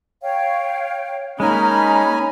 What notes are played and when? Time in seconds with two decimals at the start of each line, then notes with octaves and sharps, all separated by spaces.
0.22 C#5 F5 G5
1.40 G#3 A#3 C#4 D#4 G#5 A#5 B5